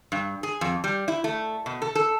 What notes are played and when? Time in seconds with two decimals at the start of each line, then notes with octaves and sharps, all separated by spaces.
0.12 G2
0.43 G#4
0.61 F2
0.84 G3
1.08 E4
1.24 A3
1.66 B2
1.82 A4
1.95 A4